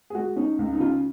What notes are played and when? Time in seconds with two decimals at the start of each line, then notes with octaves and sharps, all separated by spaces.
0.10 G#4
0.15 G#3 F#4
0.36 C#4 D#4
0.59 C#2
0.73 D#4
0.79 C#3 F4